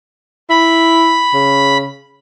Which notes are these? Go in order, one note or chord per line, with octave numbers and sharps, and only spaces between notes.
E4 B5
C#3